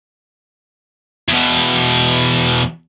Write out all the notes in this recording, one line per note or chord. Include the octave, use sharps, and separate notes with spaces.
E2 B2